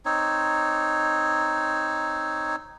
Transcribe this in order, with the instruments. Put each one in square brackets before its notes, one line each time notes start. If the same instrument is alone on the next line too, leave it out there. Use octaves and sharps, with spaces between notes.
[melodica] C4 D#4 C#5